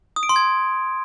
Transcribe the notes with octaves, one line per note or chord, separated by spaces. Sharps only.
D#6
D7
C6
G#6